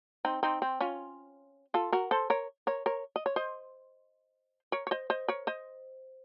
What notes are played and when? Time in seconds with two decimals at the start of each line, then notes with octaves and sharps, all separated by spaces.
0.25 C4 D#4
0.43 C4 D#4
0.62 C4
0.80 C#4 F4
1.74 F4 A4
1.92 F#4 A#4
2.11 A4 C5
2.30 A#4 C#5
2.67 A#4 C#5
2.86 A#4 C#5
3.16 D#5
3.26 C#5
3.36 C5 D#5
4.72 A#4 C#5
4.87 C#5
4.91 C5 D#5
5.10 C5 D#5
5.28 A#4 C#5
5.47 C5 D#5